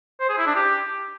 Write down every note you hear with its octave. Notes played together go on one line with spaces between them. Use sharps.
C5
G#4
E4
D4
G4